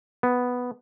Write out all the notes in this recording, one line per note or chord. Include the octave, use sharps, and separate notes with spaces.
B3